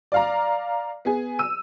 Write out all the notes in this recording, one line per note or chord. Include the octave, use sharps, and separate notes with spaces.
D5 F5 A#5
B3 G#4
E6 D#7